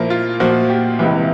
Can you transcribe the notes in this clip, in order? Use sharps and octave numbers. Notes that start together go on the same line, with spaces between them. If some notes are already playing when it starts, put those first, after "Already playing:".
Already playing: A#2 F3 A#3 E4
F4
A#2 F3 A#3 F#4
G4
C#2 C3 E3